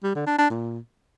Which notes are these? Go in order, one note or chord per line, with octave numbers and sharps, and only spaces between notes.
G3
D3
D4
D4
A#2